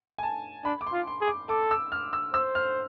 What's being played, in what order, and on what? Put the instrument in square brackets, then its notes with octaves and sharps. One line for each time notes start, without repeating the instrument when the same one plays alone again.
[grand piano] G#5
A5
[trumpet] D4 [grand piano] B5
[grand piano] D6
C6
[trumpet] F4
[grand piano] C6
[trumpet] G#4
[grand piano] D6
[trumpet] A4 [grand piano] D6
[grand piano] E6
F6
E6
[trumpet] C5 [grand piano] E6
[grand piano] F6